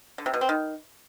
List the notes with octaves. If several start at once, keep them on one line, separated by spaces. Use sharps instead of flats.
D3
C3
B2
C4
D#3